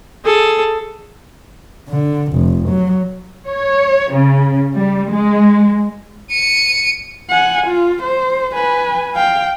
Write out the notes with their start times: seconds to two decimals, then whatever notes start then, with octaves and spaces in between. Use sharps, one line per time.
0.25 G#4 A4
1.89 D3
2.33 F1
2.69 F#3
3.48 C#5
4.14 C#3
4.74 G3
5.10 G#3
6.32 C#7 D#7
7.30 F#5 G#5
7.67 F4
8.03 C5
8.54 B4 G#5
9.15 F5 G5